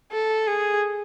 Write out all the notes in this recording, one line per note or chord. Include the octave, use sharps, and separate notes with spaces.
A4
G#4